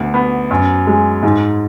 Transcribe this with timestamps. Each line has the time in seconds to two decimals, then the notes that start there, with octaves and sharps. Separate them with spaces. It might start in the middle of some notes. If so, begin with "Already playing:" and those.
Already playing: D2 B3
0.14 B3
0.51 F#2
0.87 G#3
1.23 G#2